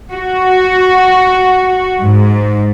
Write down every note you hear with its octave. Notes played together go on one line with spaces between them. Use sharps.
F#4
G#2